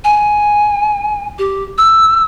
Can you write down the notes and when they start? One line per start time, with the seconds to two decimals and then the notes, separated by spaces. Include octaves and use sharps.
0.04 G#5
1.39 G4
1.78 E6